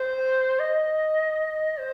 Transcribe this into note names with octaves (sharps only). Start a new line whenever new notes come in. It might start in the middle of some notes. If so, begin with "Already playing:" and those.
Already playing: C5
D#5
C5